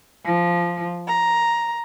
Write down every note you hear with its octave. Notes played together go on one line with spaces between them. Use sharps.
F3
A#5